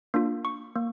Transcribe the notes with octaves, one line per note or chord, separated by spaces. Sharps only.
A#3 D4 F4
C#6
A#3